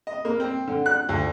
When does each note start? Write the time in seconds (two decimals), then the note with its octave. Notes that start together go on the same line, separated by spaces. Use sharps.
0.07 D#5
0.25 A#3
0.40 C4
0.67 D3
0.86 F#6
1.09 D2